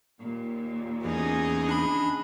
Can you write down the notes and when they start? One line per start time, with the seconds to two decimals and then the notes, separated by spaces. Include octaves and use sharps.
0.19 D#2 A#2
1.04 E2 C#3 D#4 G#4
1.69 D4 B5